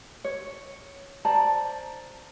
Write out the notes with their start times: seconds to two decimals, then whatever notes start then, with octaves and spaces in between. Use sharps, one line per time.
0.25 C#5
1.25 C5 D5 A5 A#5